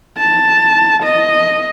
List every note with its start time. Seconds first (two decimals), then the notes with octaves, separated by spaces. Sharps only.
0.18 A5
1.03 D#5